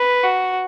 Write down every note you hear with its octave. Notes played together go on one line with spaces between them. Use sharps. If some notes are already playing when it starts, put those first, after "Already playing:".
Already playing: B4
F#4